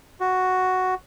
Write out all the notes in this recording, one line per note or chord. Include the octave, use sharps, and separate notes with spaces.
F#4